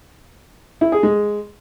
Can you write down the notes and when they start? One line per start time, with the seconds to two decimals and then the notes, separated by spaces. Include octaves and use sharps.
0.81 E4
0.92 G#4
1.03 G#3